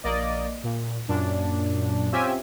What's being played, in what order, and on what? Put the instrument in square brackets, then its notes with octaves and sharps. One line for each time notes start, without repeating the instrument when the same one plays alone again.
[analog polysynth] A#1 A#3 D5 D#5
A#2
F#2 A#2 D4
C4 C#4 F4 G4 E5 G#5